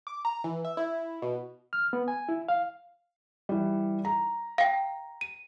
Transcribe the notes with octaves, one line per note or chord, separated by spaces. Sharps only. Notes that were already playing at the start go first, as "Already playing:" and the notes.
D6
A#5
E3
E5
E4
B2
F6
B3
G#5
E4
F5
E3 G3
A#5
F5 G5
D#7